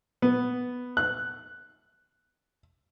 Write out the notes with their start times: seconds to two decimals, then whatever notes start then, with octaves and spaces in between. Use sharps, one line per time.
0.22 B3
0.97 F#6